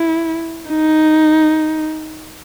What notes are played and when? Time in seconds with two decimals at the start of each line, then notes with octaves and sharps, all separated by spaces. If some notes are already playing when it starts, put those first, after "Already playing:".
Already playing: E4
0.70 D#4